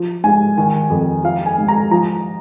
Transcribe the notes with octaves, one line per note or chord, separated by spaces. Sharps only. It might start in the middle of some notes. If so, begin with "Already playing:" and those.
Already playing: F3
G#2 G#5
D#3 G#5
F2
F3 F5
G#5
G#2
A#5
F3 A#5